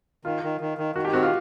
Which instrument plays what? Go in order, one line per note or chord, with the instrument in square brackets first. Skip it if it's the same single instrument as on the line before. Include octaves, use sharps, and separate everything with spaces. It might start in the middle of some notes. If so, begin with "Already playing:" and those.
[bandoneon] D#3 [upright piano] F4
[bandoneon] D#3
D#3
D#3
[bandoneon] D#3 [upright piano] F#4
[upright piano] G4
[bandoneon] C4 [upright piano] F#4
[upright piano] F4